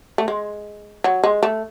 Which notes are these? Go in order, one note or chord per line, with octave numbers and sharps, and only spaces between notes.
A3
G#3
F#3
G#3
A3